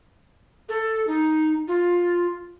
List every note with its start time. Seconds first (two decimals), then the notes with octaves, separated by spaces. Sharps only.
0.69 A4
1.07 D#4
1.68 F4